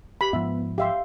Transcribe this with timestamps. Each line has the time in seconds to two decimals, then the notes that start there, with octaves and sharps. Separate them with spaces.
0.21 G4 B5
0.33 G#2 F3 B3 E5
0.78 G4 E5 F5 C6